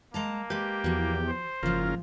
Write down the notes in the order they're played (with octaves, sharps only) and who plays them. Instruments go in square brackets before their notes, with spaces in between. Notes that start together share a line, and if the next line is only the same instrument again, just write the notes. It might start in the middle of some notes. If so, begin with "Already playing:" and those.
[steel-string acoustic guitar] G#3 A5 A#5 [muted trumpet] A#3
[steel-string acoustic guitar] G#3 B4 [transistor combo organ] G4
[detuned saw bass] E2 [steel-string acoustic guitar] F3 F#4
[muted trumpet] C5
[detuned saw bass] F#1 [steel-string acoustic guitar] G#2 F3 [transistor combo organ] C#3 F4 A#4